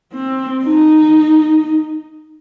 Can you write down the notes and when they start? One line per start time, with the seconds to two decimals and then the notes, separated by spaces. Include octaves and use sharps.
0.13 C4
0.64 D#4